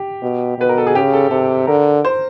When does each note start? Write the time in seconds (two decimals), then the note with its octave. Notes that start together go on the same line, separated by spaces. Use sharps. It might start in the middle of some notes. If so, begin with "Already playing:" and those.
Already playing: G4
0.23 B2
0.58 B2 B4
0.69 A#4
0.78 A4
0.87 G#4
0.95 C#3 G4
1.13 A4
1.31 C3 A4
1.67 D3 A#4
2.05 C5